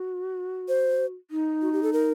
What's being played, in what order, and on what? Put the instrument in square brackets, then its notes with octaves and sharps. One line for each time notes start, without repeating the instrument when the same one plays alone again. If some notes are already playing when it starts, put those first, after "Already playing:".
Already playing: [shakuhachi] F#4
[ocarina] C5
[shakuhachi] D#4
[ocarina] F#4
G4
A4
A#4